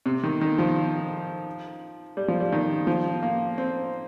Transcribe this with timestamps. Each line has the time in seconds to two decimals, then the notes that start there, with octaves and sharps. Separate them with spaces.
0.06 C3
0.23 D#3
0.41 D#3
0.59 F3
2.17 G3
2.28 F3
2.40 G3
2.52 D#3
2.87 F3
3.23 A#3
3.58 C4